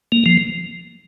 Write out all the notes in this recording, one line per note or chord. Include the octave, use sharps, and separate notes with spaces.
A#3
F3